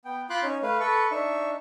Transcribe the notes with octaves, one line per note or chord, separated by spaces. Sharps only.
B3 G5
F4 B5 C6 D6 F#6 G6
C#4 D#4 C#5
A3 B4 F5
A4 B4 C#6
D4 D#4 E5 C#6